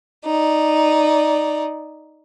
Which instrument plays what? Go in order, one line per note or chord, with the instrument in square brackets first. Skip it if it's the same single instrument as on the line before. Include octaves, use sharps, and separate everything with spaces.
[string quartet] D#4 D5